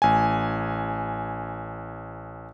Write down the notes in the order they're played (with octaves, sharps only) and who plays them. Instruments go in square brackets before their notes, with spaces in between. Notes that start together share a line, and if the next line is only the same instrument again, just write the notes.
[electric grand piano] A1 G#5